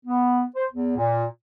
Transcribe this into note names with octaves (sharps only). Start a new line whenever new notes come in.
B3
C5
E2
A#2